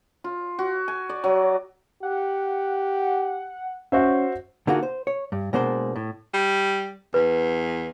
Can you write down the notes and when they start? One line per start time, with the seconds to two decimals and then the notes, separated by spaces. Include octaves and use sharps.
0.24 F4
0.59 F#4
0.88 G#5
1.09 D5
1.24 F#3
2.03 G4 F#5
3.92 C#4 F#4 C5 E5
4.67 D3 A#3 D#4 F4 F#4 G#4
4.83 C5
5.07 C#5
5.32 G2
5.53 B2 G#3 A#3 D4 C5 C6
5.96 A2
6.34 G3
7.14 E2 B4